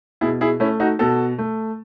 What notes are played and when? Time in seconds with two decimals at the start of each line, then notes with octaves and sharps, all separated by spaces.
0.21 B2 E4 G#4
0.41 E4 G#4
0.60 A3 C#4 E4
0.80 D#4 F#4
0.99 B2 F#4 A4
1.38 A3